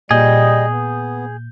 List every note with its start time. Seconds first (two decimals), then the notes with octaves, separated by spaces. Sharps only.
0.11 A#2 G3 G#4 D#5 G6
0.70 B3